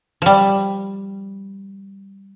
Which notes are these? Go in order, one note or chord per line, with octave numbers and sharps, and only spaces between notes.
F3 G3